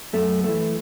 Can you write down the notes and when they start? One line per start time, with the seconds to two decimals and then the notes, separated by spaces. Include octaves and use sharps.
0.13 F#2 A3
0.44 E3 A3